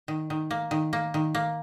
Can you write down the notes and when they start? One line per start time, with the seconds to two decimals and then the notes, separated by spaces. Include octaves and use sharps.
0.08 D#3
0.30 D#3
0.51 A#3
0.71 D#3
0.93 A#3
1.14 D#3
1.35 A#3